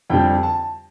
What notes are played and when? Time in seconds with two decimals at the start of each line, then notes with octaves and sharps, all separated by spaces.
0.10 F2 D3 G3 G5
0.43 A5